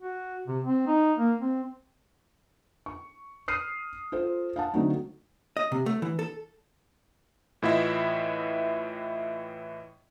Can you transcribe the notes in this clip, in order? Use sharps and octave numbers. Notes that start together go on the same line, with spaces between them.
F#4
C3
C4
D#4
A#3
C4
C#6
D#6 F6 C7 D#7
F4 A4 C5
F5 F#5 A5
D3 F#3 A3 C4 D#4
D#5
C3
A3
E3
A4
A2 E3 E4 F4 D#5 E5